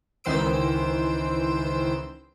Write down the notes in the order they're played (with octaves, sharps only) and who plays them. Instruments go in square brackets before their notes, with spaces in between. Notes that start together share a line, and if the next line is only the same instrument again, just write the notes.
[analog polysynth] C#2 D#3 E3 C5 E6 D7